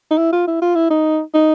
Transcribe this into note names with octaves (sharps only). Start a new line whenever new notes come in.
D#4
E4
F4
E4
F4
E4
D#4
D#4